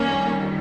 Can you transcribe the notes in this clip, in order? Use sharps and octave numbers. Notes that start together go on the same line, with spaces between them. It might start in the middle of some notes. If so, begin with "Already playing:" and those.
Already playing: F2 D#3 G3 A#3 C#4